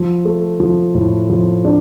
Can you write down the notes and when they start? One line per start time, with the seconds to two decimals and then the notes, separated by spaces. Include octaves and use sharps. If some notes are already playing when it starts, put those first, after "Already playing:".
Already playing: F3
0.25 A3
0.60 F3
0.95 A2
1.30 F3
1.65 D4